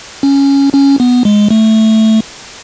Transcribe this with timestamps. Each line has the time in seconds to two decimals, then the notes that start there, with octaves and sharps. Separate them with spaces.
0.23 C#4
0.74 C#4
1.00 B3
1.25 G#3
1.51 A3